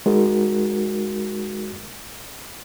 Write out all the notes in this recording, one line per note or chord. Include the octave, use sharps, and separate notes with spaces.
G#3 D#4 F#4 G#4 A#4